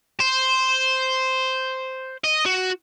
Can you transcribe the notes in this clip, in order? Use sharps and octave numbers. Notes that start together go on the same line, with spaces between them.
C5
D#5
F#4